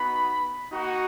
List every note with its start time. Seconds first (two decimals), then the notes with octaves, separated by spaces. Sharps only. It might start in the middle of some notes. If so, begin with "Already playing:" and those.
Already playing: B3 D#4 F#4 B5
0.71 A#3 D#4 F#4